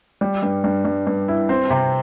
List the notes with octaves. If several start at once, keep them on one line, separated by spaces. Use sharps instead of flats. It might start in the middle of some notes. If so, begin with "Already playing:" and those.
G3
G2
G2
G2
G2
E4
C4
C3